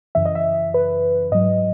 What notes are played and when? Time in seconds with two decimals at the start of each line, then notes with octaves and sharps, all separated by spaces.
0.15 F#2 C#3 E3 E5
0.25 D#5
0.35 E5
0.74 B4
1.32 G#2 F#3 D#5